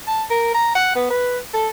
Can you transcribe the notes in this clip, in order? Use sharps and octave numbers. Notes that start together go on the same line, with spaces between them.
A5
A#4
A#5
F#5
B3
B4
A4